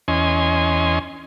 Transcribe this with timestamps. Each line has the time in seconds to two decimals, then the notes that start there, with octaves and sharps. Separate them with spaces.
0.08 E2 C#4 D#5 G#5 C6